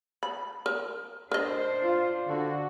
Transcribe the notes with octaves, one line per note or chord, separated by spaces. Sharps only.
B5
A#4
D4 A#4 C5 D#5
F4
D3 F#4